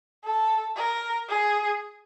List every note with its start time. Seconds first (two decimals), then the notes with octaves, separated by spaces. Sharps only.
0.24 A4
0.76 A#4
1.29 G#4